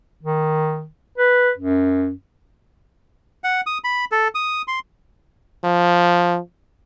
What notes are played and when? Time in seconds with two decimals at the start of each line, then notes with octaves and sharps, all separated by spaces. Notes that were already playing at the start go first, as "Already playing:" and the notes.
0.23 D#3
1.18 B4
1.57 F#2
3.44 F#5
3.67 D#6
3.84 B5
4.12 A4
4.35 D#6
4.68 C6
5.64 F3